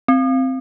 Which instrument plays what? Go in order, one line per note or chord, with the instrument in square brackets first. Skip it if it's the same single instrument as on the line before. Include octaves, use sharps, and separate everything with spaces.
[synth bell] C4